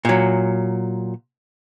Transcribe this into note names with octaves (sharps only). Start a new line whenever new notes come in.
A#2 F#3